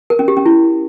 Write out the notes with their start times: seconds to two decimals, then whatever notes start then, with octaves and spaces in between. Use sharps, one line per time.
0.10 A#4
0.19 C#4
0.28 G4
0.37 C#4
0.46 E4